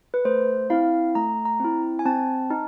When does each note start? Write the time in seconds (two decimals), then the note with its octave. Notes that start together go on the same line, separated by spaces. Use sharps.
0.14 B4
0.25 A3 C5
0.70 C4 E4 F5
1.15 A3 A#5
1.45 A#5
1.60 C4 E4
1.99 G#5
2.06 C4 A5
2.50 D#4